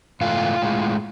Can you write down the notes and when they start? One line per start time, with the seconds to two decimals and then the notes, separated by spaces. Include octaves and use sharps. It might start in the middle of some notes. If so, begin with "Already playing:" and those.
0.21 G#2 E3 A3 F4
0.62 A2 G#3